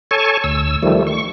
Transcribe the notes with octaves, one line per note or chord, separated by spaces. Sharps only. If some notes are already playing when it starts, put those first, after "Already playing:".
A4 C#5 G#5 A5 C#6
D2 E6
D#3 F3 G3 A3
C#6